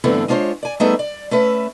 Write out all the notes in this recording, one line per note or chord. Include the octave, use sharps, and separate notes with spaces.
G2 D3 E3 A3 B3 C4
G#3 D4 F4 A4 C5 C#5
D5 G#5
G3 A3 B3 D#4 G#4 E5
D5
A3 C#4 B4 E5